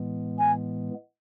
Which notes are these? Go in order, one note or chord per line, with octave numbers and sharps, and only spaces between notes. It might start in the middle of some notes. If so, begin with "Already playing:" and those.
Already playing: A2 E3 G#3 B3
G#5